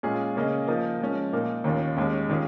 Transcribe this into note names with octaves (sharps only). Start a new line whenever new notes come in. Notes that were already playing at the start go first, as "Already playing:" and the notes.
A#2 G#3 C#4 F4 G#4
C#3 A#3 C#4 G#4 D#5
F3 A#3 D#4 A#4 D#5
F3 G#3 C#4
A#2 A#3 D#4 A#4
D#2 D#3 C#4 F4
D#2 D#3 G#3 C#4
D#3 C#4 F4 G#4